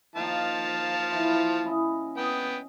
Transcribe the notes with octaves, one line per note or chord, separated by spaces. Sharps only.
D#3 F3 A#3 F5 A5
E3
C#4 E4 D#5
B3 D#5 G5